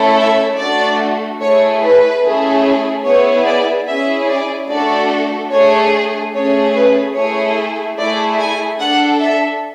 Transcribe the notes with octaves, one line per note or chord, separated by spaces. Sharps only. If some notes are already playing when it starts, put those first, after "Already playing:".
Already playing: A3 C#4 E4 A4
E5
A3 D4 F#4 D5
A3 E4 G#4 C#5
B4
A3 C#4 E4 G#4
B3 E4 G#4 C#5
D5
C#4 E4 G#4 E5
D5
A3 D4 F#4 A4 D5
A3 D4 G#4 C#5
A3 C#4 G#4 C#5
B4
A3 E4 G#4 C#5
A3 E4 G#4 D5
G#5
D4 A4 F#5
E5